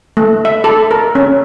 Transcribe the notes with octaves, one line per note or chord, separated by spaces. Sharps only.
A3
E5
A4
A#4
C#4